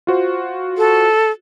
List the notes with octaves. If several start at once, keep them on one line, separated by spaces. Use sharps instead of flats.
F4 F#4 C5
A4